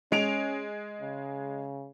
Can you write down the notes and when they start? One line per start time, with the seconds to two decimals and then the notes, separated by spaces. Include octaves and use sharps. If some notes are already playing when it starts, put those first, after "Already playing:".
0.12 G#3 C#4 D7 F7
1.01 C#3